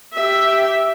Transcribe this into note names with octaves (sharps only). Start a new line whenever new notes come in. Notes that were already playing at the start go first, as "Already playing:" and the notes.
G4 E5